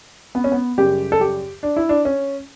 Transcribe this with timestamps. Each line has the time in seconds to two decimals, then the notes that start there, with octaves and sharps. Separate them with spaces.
0.35 B3
0.44 C#4
0.52 B3
0.78 F#2 C#3 G3 G4
1.12 A4
1.21 G4
1.63 D4
1.76 E4
1.89 D4
2.05 C#4